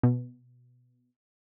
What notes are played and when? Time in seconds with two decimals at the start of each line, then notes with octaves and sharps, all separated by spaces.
0.03 B2